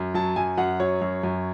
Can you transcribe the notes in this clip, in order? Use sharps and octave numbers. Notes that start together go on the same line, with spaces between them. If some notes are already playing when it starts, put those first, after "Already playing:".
Already playing: F#2
F#3 A5
F#2 G#5
F#2 F#5
F#3 C#5
F#2
F#2